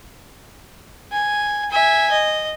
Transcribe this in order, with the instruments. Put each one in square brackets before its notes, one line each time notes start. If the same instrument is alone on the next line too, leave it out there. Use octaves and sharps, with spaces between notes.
[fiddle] G#5
E5 G#5
D#5